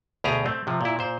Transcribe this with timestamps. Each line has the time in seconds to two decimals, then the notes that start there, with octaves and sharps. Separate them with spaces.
0.24 D2 B2 G4 G#4 A#5
0.46 A3 C4
0.67 C3 F3
0.81 A#2 E4
0.99 A#2 C5